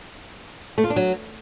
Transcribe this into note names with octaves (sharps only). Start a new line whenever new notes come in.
A3
F4
D4
F#3